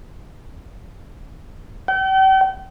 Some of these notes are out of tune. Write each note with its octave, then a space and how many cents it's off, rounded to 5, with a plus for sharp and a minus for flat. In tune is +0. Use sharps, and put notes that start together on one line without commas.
G5 -40